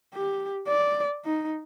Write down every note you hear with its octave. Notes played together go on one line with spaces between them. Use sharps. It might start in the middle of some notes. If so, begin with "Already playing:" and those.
G4
D5
D#4